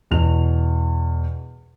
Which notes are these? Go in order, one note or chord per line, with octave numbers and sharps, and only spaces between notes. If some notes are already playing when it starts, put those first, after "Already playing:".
E2 B2 F7